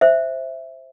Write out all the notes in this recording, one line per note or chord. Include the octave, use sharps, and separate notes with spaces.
C5 E5